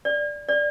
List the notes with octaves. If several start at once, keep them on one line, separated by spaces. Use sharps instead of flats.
D5
D5